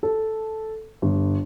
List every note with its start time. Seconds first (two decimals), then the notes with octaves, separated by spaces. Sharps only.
0.03 A4
1.02 G1